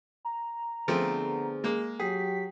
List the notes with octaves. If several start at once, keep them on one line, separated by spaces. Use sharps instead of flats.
A#5
D3 F3 A3 B3 C4 G#4 C5
G#3 A#3
F#3 G4 G#4 G5 B6